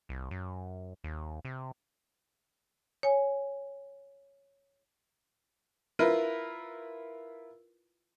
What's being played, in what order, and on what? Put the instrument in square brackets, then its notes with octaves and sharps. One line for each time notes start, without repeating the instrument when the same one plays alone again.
[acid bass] C2
F#2
D#2
C3
[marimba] C#5 G#5
[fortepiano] E4 F4 A#4 B4